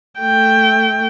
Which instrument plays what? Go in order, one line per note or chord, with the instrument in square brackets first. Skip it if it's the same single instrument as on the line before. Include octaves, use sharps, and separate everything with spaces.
[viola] A3 G5